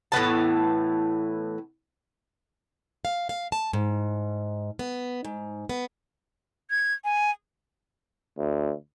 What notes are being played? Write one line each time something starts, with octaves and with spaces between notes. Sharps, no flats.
A2 E3 B3 A5
F5
F5
A5
G#2
B3
G#2
B3
G#6
G#5
D2